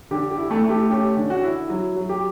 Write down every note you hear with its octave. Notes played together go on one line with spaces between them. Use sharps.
D3 G4
G4
E4
A3 A4
A3
G4
C#4 G4
D3
F#4
E4
F#3
F#3
G4